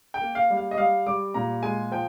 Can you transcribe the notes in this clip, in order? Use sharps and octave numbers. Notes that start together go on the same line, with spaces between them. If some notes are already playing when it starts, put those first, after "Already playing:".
G5
A#3
F5
G3
F5
D#5
G3 F5
G3 D6
A#2 A#5
G#3 G#5
F3 G5